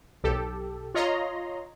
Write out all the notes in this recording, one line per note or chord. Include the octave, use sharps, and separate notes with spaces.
B1 G4 A4
F4 C#5 D#5 A#5 C6